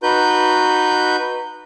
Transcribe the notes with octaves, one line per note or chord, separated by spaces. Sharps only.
D#4 F#4 B4 G6